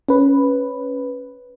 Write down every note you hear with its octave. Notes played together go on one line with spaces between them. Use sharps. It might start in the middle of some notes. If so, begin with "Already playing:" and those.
C#4 B4